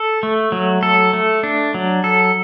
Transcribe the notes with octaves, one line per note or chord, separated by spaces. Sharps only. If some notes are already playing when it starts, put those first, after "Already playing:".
Already playing: A4
A3
F#3
A4
A3
D4
F#3
A4